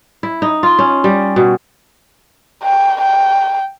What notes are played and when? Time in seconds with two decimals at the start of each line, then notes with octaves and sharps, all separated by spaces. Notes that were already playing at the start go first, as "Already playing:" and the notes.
0.23 E4
0.42 D#4
0.63 F4
0.79 C#4
1.04 G3
1.36 B2
2.63 G5
3.01 G5